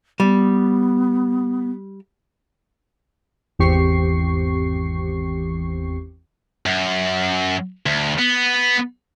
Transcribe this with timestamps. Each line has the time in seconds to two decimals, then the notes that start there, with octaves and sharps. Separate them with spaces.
0.20 G3 B3
3.59 G#1 E2 C4 G4 C#6 C7
6.66 F#2
7.86 D2
8.19 B3